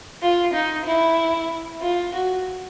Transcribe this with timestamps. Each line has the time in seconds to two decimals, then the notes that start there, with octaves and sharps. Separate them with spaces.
0.22 F4
0.54 D#4
0.86 E4
1.82 F4
2.14 F#4